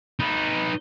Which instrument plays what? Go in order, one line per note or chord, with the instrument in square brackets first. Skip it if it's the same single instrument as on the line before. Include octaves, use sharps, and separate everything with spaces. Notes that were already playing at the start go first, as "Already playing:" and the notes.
[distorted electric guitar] D#4 B4